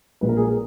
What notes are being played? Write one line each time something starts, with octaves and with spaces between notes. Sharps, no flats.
A#1 A#2 G#3 B4
A#4
G#4
A#4